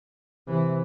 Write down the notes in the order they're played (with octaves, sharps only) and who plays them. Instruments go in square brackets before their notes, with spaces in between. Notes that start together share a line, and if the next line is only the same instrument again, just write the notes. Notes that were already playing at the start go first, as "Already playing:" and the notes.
[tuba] C3 [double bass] E3